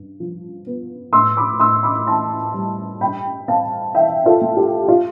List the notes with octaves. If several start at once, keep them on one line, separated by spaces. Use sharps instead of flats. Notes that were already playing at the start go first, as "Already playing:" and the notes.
Already playing: G2
F3
B3
A2 C6 E6
B5 D6
A2 C6 E6
B5 D6
E3 A5 C6
G3
G2 G5 B5
C4 F5 A5
E3 E5 G5
F4 A4
A3
G4
F4